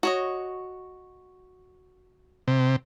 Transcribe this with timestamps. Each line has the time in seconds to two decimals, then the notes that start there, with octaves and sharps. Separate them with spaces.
0.03 F#4 C#5 D#5
2.48 C3